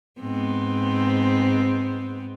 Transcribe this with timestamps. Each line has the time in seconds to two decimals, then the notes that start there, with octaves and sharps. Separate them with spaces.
0.20 G#2 B3 C4